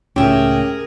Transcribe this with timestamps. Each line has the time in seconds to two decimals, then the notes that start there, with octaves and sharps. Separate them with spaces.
0.16 C#2 A2 C#4 G4 G#4 A#4 E5